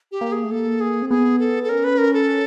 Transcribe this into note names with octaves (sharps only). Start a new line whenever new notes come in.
G4
A#3
G#4
A3
A#3 A4
G#4
C4
B3 G#4
A4
A4
C#4 A#4
B4
A#4
A4